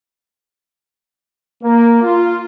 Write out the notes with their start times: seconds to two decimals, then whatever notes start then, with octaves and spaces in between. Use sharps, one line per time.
1.63 A#3
2.02 F4